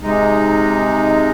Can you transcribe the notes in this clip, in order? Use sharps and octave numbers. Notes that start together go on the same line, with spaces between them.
C3 G#3 D#4